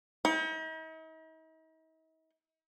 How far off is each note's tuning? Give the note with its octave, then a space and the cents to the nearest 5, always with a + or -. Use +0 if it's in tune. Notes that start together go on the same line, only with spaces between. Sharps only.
D#4 +45